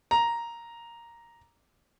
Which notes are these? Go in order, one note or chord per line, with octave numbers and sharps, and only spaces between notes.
A#5